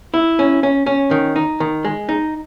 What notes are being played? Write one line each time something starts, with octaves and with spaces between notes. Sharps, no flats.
E4
C#4
C#4
C#4
D#3
D#4
D#3
G#3
D#4